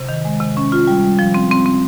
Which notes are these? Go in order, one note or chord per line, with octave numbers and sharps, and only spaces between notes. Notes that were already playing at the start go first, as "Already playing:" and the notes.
Already playing: C3
D#3
G#3
C3
C#4
F4
G3
G3
F3
C4
C4
C4